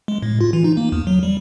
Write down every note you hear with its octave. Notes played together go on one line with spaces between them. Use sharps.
G#3
A2
F4
E3
D#4
A#3
E2
F#3
G3